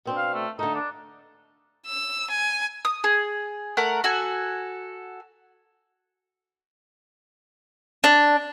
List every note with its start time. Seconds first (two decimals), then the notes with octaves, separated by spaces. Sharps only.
0.05 B2 C4 D4
0.17 F5
0.34 A3
0.59 D3 A3 D#4
0.74 D4
1.87 E6
2.31 G#5
2.85 D#6
3.04 G#4
3.77 A3 A#4 F#5
4.04 F#4 A4 G#5
8.04 D4